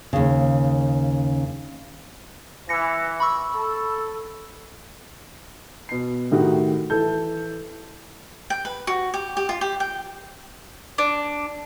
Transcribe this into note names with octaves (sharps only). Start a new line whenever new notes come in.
D#2 C#3
E3 A#6 C#7
B5 C#6 E6
A4
B2 C7
A2 D#3 D#4 F#4 G4
E3 A4 G6
G5
B4
F#4
G4
G4
F4
G4
G5
D4